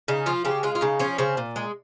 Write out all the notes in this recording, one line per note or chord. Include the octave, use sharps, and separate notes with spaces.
C#3 D#4
F3 F4
C#3 G4
G#3 F4
F4
C#3 D#4
F3 C#4
C#3 C4
A#2
G#3